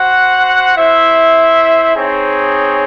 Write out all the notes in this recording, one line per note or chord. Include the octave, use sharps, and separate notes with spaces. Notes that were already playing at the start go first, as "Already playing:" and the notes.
Already playing: F#4 C5 F#5
E4 C5 E5
C4 D#4 G#4 C#5